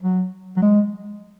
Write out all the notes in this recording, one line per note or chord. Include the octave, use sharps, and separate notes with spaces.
F#3
F#3
G#3